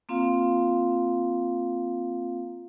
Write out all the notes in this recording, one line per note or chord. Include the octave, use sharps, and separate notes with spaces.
A#3 C4 F4 F5